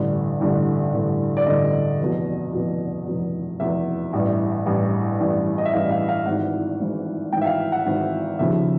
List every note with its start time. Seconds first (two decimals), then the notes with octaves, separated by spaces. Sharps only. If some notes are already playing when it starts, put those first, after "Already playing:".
Already playing: A1 G2 D3
0.40 A1 G2 D3
0.93 A1 G2 D3
1.37 D5
1.46 A1 G2 D3 D#5
2.00 F1 E2 B2
2.53 F1 E2 B2
3.07 F1 E2 B2
3.59 F1 E2 B2 E5
4.13 A1 G2 E3
4.66 A1 G2 E3
5.20 A1 G2 E3
5.58 D#5
5.65 E5
5.73 A1 G2 E3 F5
5.91 F5
6.09 F5
6.26 G#1 G#2 E3 F#5
6.79 G#1 G#2 E3
7.32 G#1 G#2 E3 G5
7.42 E5
7.46 F5
7.72 F#5
7.86 G#1 G#2 E3
8.39 D#2 C#3 F3 E5